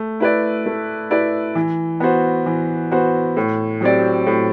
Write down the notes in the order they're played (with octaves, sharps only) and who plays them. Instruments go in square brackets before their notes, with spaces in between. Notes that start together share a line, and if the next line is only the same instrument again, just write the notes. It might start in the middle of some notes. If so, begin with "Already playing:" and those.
Already playing: [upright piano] A3
E4 B4 D5
A3
E4 B4 D5
E3
B3 F#4 C5
E3
B3 F#4 C5
A2
F#3 C4 G4 D5
A2